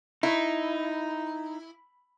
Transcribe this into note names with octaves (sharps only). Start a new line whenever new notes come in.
D#4 E4